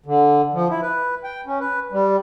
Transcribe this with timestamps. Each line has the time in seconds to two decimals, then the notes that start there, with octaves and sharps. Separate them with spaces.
0.06 D3
0.54 F3
0.69 E4
0.82 B4
1.24 G5
1.46 C#4
1.60 B4
1.92 G3